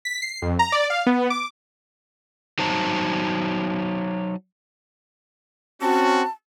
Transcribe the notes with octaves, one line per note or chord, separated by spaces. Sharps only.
B6
C7
F2
A#5
D5
F5
B3
D6
F#3 D#4 C5 C#5 A5 A#5
C4 C#4 F#4 A5